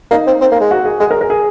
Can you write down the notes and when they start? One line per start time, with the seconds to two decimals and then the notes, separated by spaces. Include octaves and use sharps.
0.11 A#3 D#4
0.27 C4
0.41 C4
0.52 A#3
0.60 G#3
0.71 F#4
0.85 G#4
1.00 G#3 G#4
1.11 A#4
1.21 A#4
1.30 G#4